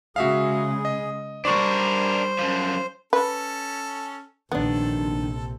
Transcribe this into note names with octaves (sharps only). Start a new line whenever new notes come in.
C#3 G#3 F#4 G#4 E5 F5
D#5
G3 D4 A#4 C5 D5 C#6
F#2 F3
C#4 A4 B4
A#1 C3 D#3 B3 D4 A4